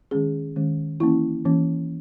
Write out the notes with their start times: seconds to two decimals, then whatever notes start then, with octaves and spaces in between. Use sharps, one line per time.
0.11 D#3 G#3 C#4 G#4
0.56 D#3 G#3 C#4
1.00 E3 A#3 C#4 E4
1.45 E3 A#3 C#4